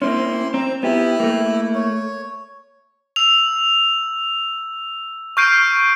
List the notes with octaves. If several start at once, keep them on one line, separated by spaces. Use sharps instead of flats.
A#3 C4 C#4 E4 C6
C4 A#5
B3 E4 G4
A3 A#3
C#5
E6 F7
C#6 F6 G6 C7 D7 D#7